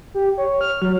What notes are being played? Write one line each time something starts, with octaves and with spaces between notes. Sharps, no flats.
G4
C#5
F6
F#3